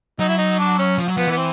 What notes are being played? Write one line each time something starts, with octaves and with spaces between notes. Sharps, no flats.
F#3 D#4
E4
D#4
D4
C#4
F3
F#3
F3 B3
E3 B3
C4